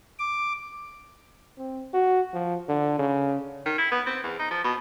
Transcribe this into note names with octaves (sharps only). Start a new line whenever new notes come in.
D6
C4
F#4
F3
D3
C#3
D#3
E4
B3
C4
E2
D#4
F3
B2